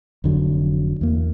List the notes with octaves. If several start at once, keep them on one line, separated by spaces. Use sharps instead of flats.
F1 D3 F#3
E2 A#3